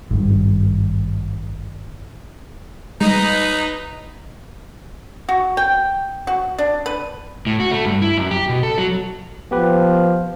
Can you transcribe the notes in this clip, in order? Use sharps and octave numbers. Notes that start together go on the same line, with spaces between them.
G#1 G2
G3 G#3 D#4 B4 D#5
F#4
G5
F#4
D4
B4
A2
F#4
A3
G2
E4
F#2
G4
B2
A4
F#3
F3 B3 G4 B4